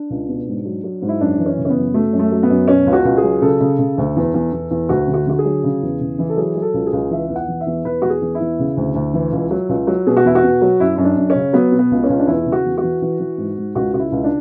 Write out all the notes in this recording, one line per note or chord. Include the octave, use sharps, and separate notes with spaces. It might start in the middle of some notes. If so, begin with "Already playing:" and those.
Already playing: D4
C#2
B2
G#2
F#3
F#3
G#2
E4
F#2 D4
E3
C#4
C#3
C#4
B3
F#2
F#3 A3
F#2
A3
F#3
B3
F#2
B2 C#4
C#2
F#4
C#2
G#4
F#3
C#3 A4
C#3
C#3
D2
E2
E2
E2
E2
D2 F#4
D3
F#4
D3 F#4
G#4
F#3
C#3
E2
C#3
E3
A4
F#3 G#4
F#3
A4
C#2
G#4
C#2
E3 E5
E2
F#5
E3
E5
E2
E2 B4
E2 F#4
G#4
E2
E4
E2
C#3
D2
D2
E3
C#2
F#3
C#2
F#3
B2 G#4
F#4
E2 E4
F#4
B2
F#3
F#2 E4
F#2 E4
D4
F#2
C#4
C#3
F#3 B3
B2
B3
C#2
C#4
C#2
D4
E2 E4
C#3
F#4
E2
F#4
E3
E3
E3
G#2
G#2
C#2 F#4
C#3 F#4
E4
C#2
D4